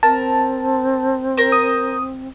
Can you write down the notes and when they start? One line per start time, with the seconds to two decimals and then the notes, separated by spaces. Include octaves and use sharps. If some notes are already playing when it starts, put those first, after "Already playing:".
0.03 C4 A#4 A5
1.37 A#4 C5
1.52 D#6